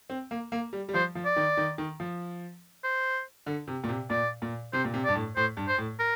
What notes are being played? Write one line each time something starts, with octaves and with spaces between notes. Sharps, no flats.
C4
A#3
A#3
G3
G3
F3 C5
F3
D5
D#3
D#3
D#3
F3
C5
D3
C3
A#2
C3
A#2 D5
A#2
C3 C5
A#2
C3
G2 D5
A2
A2 C5
G2
C5
A2
A#4